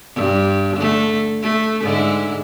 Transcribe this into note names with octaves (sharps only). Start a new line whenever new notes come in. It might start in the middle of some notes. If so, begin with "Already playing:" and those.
G2
D3 A3
A3
G#2 D3 E4